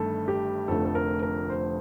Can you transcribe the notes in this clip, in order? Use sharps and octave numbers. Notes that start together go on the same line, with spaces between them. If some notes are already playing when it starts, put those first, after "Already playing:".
Already playing: G1 G2 D#3 A3 A4
G4
F1 F2 D3 A3 A4
A4
A#4
A#4
C5